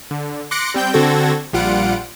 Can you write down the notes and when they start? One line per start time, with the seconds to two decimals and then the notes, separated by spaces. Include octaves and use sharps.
0.11 D3
0.51 C6 D6 F#6 A#6 C#7 D7
0.74 G3 C4 G5 G6
0.93 D3 C4 F#4 A4 G#6 A#6
1.53 A#1 G3 F4 F#5 D7